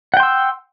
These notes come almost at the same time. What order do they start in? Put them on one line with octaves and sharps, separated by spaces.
F#5 G5 C6 E6